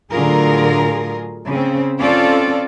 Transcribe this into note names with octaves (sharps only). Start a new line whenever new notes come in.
A2 D3 F#3 F4 G#4 A#4
C#3 C4
C4 C#4 F4 A4 D5